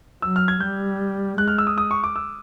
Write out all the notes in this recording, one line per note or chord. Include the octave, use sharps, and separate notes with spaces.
F#3 E6
F6
G#6
G3 G6
G#3 F#6
F6
E6
D#6
D#6
C#6
D6
E6